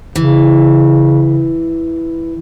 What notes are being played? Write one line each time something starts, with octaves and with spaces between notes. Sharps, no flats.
C#3 E3